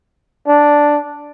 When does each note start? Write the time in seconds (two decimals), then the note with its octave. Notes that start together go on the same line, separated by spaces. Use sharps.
0.47 D4